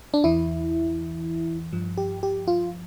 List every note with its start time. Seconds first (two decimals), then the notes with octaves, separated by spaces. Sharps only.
0.14 D4
0.24 E2 E3 E4
1.73 G2 F3
1.97 G4
2.23 G4
2.48 F4